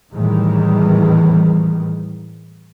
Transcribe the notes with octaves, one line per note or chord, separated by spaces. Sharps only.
E2 A2 D#3 E3 G3 G#3